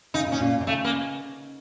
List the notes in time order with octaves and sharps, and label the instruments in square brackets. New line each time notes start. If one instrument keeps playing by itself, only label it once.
[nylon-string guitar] C#3 [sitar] D#4
[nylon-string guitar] A#2
[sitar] C#4
[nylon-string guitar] A#2
C3
[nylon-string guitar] C#3 [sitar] A3
[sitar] A#3